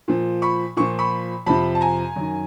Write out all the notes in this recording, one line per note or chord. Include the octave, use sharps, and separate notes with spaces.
A#2 F3
B5 C#6
A#2 F3 C#6
B5 C#6
F2 C3 F3 A5 B5
A5
G#5 A#5
F#2 D#3